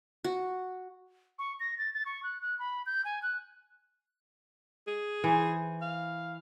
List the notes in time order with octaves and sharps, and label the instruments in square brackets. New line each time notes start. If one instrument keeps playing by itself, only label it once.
[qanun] F#4
[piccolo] C#6
A#6
A6
A6
C#6
F#6
F#6
B5
G6
G#5
F#6
[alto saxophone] G#4
[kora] E3 C5
[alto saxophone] F5